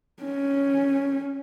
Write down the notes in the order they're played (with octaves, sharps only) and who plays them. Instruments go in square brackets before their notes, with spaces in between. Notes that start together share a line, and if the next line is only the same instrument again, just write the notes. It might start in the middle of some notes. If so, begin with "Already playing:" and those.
[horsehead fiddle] C#4